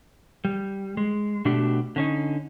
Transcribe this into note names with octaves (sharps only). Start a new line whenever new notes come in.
G3
G#3
B2 A3 D4 F#4 G4
D3 C#4 D#4